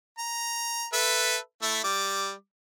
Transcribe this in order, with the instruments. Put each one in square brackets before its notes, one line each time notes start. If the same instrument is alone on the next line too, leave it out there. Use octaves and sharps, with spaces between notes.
[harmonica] A#5
A4 B4 E5
A3 E4 E5
G3 D6